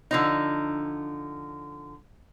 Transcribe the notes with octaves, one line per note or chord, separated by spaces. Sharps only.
D3 F3 D#4